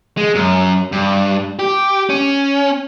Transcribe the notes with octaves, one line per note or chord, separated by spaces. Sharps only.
G#3
F#2
G2
G4
C#4